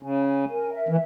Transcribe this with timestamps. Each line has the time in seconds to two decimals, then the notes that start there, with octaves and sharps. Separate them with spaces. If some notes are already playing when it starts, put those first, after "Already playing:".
0.02 C#3 G#5
0.26 G#5
0.48 A#4
0.72 E5
0.89 E3